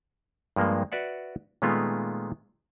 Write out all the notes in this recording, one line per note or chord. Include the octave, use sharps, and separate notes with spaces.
G2 F3 G#3 A#3
F#4 B4 D5 E5 F#5
A#2 D#3 G#3 A3 B3 F4